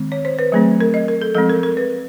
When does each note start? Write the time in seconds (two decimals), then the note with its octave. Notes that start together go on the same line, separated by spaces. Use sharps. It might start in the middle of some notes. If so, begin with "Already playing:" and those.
Already playing: D#3 G#3 C4
0.12 C#5
0.25 C5
0.39 B4
0.52 F#3 A3 C4 G#4
0.80 A#4
0.94 D#5
1.08 A#4
1.22 A4
1.35 F3 G#3 C4 A4
1.50 A#4
1.63 A#4
1.77 B4